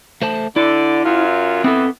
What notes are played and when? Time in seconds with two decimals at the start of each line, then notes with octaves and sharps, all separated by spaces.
0.22 A3 C5 A5
0.56 D3 E4 D5
1.05 F#2 F4
1.64 E3 B3 C4 A4